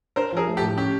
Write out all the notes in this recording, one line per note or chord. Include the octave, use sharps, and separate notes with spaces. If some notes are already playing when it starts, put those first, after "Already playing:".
D4 A#4 C5
F3 G#4 A#4
A3
G4 A4
A2
C#4 G4